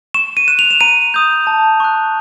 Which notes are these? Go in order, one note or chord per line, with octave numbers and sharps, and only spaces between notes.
C#6 E7
D#7
F#6 E7
F7
E7
A#5 D#7
D#6 G6
A5
C#6 F#6